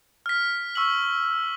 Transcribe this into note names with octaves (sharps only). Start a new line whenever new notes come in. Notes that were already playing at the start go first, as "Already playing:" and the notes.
F6 B6
C#6 E6 B6 F#7